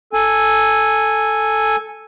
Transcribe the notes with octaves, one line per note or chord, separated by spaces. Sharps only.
A4 G#5